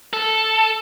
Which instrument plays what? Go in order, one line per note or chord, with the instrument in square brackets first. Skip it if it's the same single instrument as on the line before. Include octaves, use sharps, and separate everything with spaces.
[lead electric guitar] A4